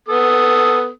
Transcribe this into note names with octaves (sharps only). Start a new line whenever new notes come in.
B3 A4 D#6